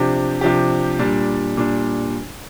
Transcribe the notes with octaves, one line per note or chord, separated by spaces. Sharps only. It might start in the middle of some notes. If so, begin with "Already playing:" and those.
Already playing: C3 F3 D4 G4
C3 F3 D4 G4
A#2 G3 D4
A#2 G3 D4